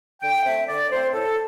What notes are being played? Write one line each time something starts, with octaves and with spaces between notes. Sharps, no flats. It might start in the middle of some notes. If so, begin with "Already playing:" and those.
D3 G5
A3 C4 E5
D3 D5
A3 C4 C5
A2 A4